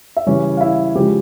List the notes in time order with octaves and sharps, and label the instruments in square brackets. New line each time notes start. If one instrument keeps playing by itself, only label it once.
[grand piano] E5
C#3 E3 G3 C#4 C#5
F5
E4 E5
C#3 F3 G#3 G4 G5